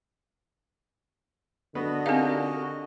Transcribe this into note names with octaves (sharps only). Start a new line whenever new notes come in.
D3 B3 F#4 D#5
C4 D#4 G4 A#4 F5